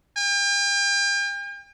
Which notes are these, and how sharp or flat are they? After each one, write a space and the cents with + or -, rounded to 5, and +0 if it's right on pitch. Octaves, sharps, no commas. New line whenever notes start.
G5 +40